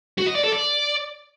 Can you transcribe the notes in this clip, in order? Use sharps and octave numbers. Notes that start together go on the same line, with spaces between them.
F#4
D#5
D5
A4
D5